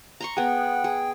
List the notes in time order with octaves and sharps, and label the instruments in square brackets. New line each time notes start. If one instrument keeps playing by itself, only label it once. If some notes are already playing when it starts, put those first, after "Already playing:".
[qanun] A#5 C6 C#6
[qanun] B3 G#4 [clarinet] F#5 [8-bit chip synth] G5
[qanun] G#4